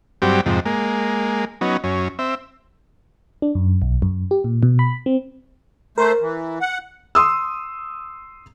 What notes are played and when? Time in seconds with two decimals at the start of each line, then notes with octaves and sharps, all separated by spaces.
0.22 G2 F#3 C4 G4
0.46 F2 G#2 C3
0.66 G#3 A#3
1.61 F#3 B3 C#4 D#4
1.84 F#2 C#4
2.19 C4 E5
3.42 D4
3.55 F#2
3.82 B1
4.02 F#2
4.31 G4
4.44 A#2
4.63 B2
4.79 B5
5.06 C4
5.98 A3 A#4 C5
6.21 E3
6.61 F#5
7.15 C6 D#6 E6